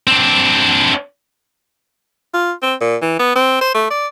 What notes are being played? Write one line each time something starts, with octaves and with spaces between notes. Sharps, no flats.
C4 D4
F4
C4
A#2
E3
B3
C4
C5
A3
D5